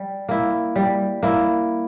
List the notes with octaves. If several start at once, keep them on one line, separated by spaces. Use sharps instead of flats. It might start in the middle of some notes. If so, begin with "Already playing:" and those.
Already playing: G3
A#3 E4
G3
A#3 E4